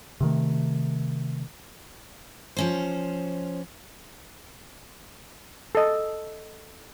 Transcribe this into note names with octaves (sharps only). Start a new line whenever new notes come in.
C3 D#3 A3
F3 C#4 C5
A4 D#5